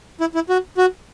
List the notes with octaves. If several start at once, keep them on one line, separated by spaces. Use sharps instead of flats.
E4
E4
F#4
F#4